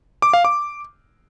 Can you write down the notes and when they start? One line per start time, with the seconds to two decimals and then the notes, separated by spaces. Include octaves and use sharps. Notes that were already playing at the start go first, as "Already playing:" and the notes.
0.22 D6
0.33 F5
0.45 D6